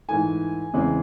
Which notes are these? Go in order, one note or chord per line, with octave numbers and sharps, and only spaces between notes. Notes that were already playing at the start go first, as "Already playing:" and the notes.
G#2 E3 A3 G#5
E2 C#3 E3 G#3 C4